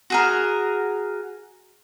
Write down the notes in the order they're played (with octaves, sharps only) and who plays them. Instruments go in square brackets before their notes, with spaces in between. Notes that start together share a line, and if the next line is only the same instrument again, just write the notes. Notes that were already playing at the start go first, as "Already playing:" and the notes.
[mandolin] F#4 G#4 A#4